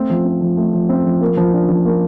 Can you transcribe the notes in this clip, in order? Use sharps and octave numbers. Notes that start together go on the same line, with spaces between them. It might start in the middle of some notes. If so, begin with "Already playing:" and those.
Already playing: A3 C4
F3
C4
F3
A3
F3
C4
F3
A#3
F3
D4
F3
A#3